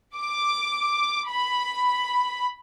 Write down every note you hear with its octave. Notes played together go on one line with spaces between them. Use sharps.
D6
B5